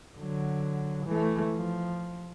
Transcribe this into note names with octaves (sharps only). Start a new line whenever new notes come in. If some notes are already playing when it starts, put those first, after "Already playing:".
D3 F#3
E3 A3
F3